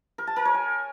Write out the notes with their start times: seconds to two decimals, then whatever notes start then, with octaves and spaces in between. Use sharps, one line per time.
0.18 A#4
0.27 A5
0.36 A#4
0.45 C#5
0.54 G#5